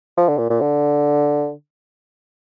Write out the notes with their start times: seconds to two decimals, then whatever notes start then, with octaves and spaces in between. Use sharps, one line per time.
0.17 F3
0.28 D3
0.38 A#2
0.50 A#2
0.61 D3